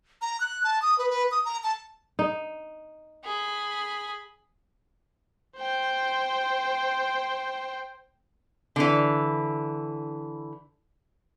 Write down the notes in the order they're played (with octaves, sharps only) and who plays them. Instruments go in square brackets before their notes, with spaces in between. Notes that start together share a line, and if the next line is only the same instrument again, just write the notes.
[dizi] A#5
F#6
A5
D#6
B4
B4
D#6
A#5
A5
[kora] D#4
[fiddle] G#4 B5
[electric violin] C5 G5
[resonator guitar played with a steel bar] D3 E3